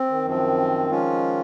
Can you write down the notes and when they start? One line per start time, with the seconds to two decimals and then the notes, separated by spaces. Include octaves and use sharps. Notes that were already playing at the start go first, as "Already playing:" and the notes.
Already playing: C4
0.09 D#3
0.25 F#2 F3 C4
0.90 F3 G#3 C#4 F4